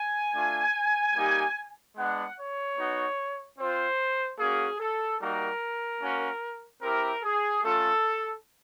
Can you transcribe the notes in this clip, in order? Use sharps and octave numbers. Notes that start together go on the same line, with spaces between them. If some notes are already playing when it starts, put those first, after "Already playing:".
Already playing: G#5
A3 D4 F4
G3 A#3 D#4 G4
G#3 B3 D4 F#5
C#5
B3 D#4 F#4
C4 F4 C5
A#3 C#4 F#4 G#4
A4
G3 A#3 D#4 F#4 A#4
A#3 C#4 F#4
C4 E4 G4 A#4
G#4
A3 C#4 F4 A4